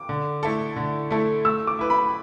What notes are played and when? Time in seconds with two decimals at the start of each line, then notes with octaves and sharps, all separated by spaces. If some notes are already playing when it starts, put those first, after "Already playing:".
Already playing: D6
0.09 D3
0.43 A3 E4 A4
0.76 D3
1.11 A3 E4 A4
1.45 A3 E6
1.67 D6
1.79 E4 B4
1.90 B5